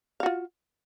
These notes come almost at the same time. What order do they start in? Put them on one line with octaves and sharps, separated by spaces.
F5 F#4 F4